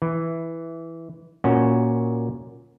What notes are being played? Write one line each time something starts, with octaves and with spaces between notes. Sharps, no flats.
E3
A#2 C#4 F#4